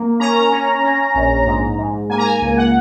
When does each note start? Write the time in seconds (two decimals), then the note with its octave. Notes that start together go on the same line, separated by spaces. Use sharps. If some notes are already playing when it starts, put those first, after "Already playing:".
Already playing: A#3
0.20 C#4 A#5
0.52 C#4
0.83 C#4
1.15 A#1
1.46 G#2
1.78 G#2
2.10 A#3 G#5
2.18 A#5
2.26 G#5
2.41 C#2
2.57 F#5